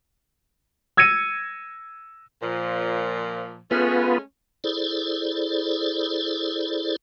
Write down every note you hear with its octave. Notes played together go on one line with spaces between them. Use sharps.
E6 G#6 A#6 C#7 D#7
A#2 F3
G#3 A3 B3 C#4 F4 B4
E4 G#4 A4 C5 D5